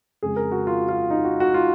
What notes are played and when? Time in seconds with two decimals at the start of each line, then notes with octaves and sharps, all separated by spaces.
0.22 F2 C#3 G#3 G#4
0.36 A#4
0.52 F#4
0.67 F4
0.89 F4
1.10 D#4
1.25 F#4
1.40 F#4
1.54 F4